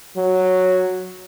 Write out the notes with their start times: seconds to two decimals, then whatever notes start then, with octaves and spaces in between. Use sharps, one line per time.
0.17 F#3